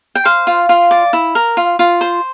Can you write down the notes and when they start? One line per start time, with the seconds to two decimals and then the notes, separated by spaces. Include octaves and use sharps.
0.15 G5
0.25 C5 F5
0.47 F4
0.69 F4
0.91 D5
1.13 E4
1.35 A#4
1.57 F4
1.79 F4
2.01 C5